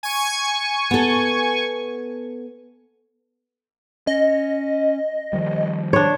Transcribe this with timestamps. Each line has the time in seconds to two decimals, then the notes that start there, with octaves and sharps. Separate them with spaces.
0.03 G#5 C#6
0.91 B3 A4
4.07 C#4 D#5
5.33 D#3 F3 G3
5.93 D4 C#5